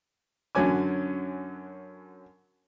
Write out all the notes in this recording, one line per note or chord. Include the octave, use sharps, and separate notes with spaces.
F#2 D3 F#3 C#4 G#5 D6